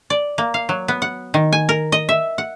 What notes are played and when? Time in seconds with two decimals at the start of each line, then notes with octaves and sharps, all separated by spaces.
0.10 D5
0.38 A#3
0.54 F5
0.69 F#3
0.88 B3
1.02 F#5
1.34 D#3
1.53 G#5
1.69 A#4
1.92 D#5
2.09 E5
2.38 F#5